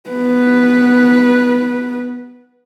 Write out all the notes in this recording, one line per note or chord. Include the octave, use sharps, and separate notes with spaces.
B3 B4